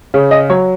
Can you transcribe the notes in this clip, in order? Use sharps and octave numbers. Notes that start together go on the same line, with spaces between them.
C#3
D#5
F#3 C#5